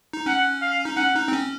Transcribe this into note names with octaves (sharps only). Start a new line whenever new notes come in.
D#4
C#4 F#5
F5
D#4
C#4 F#5
D#4
C4
C#4